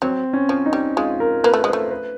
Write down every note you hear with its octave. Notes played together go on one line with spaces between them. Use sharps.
F#3 C4
C#4
F3
D#4
G3
G#3 F4
A#4
A#3 B4
A3
G#3 C5
A3
B4